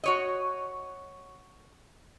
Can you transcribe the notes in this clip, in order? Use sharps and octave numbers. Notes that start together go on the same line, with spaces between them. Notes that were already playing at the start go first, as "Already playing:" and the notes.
F#4 C#5 D#5